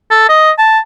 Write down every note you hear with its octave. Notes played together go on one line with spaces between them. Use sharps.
A4
D#5
A5